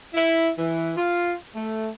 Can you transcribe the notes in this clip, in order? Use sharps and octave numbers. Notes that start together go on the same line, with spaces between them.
E4
E3
F4
A3